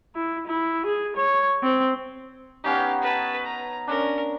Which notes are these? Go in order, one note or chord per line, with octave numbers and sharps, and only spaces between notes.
E4
E4
G#4
C#5
C4
B3 C#4 D#4 G4 F5
B4 A5
A#5
C#4 D4 A#4